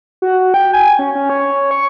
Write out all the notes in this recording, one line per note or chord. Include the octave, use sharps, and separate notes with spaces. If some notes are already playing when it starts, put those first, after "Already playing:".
F#4
G5
G#5
C#4
C#4
C#5
C#6